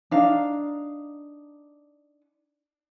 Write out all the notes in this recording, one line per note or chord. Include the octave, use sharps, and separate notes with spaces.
D4 D#4 F5